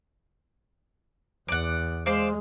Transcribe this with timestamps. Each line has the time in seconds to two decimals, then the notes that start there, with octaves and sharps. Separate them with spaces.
1.48 E2 D5 F#5
2.06 G#3 C5 D5 F5